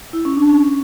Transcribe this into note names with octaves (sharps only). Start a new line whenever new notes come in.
E4
C#4
D4
C#4